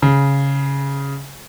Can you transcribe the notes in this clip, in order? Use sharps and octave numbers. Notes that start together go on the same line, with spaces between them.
C#3